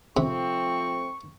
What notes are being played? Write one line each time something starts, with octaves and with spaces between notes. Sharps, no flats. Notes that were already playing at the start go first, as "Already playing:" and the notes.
C3 F3 A3 C4 C#6